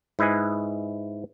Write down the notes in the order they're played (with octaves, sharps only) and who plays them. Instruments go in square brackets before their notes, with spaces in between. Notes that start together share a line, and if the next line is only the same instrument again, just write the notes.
[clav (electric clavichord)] G#2 E4 B4 D#5 G#5